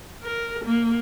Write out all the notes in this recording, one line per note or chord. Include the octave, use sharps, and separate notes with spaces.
A#4
A#3